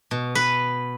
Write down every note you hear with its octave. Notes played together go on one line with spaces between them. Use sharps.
B2
B4